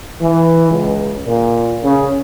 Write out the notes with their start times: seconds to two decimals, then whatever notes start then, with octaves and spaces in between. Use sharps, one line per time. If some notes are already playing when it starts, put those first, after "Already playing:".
0.21 E3
0.70 C#2
1.26 A#2
1.82 C#3